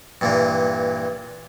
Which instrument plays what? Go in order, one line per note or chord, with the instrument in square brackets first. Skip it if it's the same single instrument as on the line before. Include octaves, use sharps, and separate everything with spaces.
[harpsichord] G2 A#2 E3